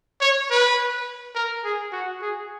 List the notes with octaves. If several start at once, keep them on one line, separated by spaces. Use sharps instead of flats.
C#5
B4
A#4
G#4
F#4
G#4